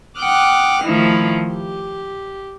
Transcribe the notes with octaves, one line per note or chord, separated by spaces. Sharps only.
F#5 G5 D6 D#6 F6 F#6
D#3 F3 A3 D#4 E4
G4